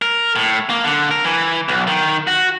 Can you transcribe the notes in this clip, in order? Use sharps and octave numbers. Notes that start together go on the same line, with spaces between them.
A#4
A2
A#3
D3
A#4
E3
B1
D#3
F#4